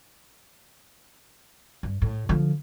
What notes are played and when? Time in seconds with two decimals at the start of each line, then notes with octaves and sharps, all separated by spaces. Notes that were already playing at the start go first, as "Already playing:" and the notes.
1.83 G2
2.02 A2
2.29 D3 F3